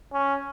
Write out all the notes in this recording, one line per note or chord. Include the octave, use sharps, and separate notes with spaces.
C#4